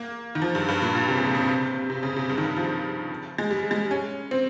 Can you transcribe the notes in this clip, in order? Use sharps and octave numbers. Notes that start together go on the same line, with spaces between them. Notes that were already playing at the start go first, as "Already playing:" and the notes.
Already playing: A#3
D#3
F3
G2
G2
A#2
A#2
C3
C#3
C3
C#3
C3
C3
C#3
C3
G2
D#3
C#3
F3
G#3
G3
G#3
C#4
C4